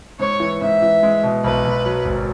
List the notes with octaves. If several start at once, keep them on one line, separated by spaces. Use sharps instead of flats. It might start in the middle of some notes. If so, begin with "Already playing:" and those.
G#2 C#5
E3
G#2 E5
E3
G#3
B2
B1 B4
B1
F#3
G#1